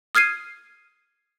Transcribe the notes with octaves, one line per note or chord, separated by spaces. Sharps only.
D#6 F6 G#6 C7 D#7